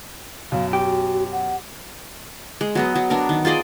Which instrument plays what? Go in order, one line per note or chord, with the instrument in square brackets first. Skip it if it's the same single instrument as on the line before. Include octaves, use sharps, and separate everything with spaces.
[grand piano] F#2 B2 [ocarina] F5
[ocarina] F#4 [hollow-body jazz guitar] G4
[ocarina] F#5
[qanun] G#3
F#3 B3 D#5
F#3
B3 D4 A#4
D#3
F4 G#4 D5 D#5